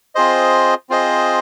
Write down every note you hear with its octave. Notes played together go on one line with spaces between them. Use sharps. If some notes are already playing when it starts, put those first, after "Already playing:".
C4 F4 G#4 C5 D#5
C4 F4 G#4 C5 D#5